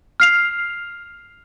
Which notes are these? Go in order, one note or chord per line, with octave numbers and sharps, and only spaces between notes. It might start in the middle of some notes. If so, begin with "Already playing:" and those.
F6 C7 F7